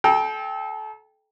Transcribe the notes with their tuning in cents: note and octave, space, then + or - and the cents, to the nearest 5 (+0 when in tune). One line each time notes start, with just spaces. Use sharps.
A4 -30 G5 +5 A#5 +0